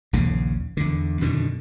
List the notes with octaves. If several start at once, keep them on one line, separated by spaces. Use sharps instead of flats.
A#1 D#2 C#3
E2 D3
F#2 B2 D3 D#3